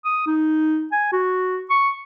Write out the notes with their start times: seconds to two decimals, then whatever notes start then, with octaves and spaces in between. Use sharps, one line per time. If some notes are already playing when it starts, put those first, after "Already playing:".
0.05 D#6
0.27 D#4
0.92 G#5
1.13 F#4
1.70 C#6